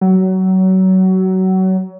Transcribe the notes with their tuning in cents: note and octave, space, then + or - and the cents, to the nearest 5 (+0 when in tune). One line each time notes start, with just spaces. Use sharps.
F#3 +25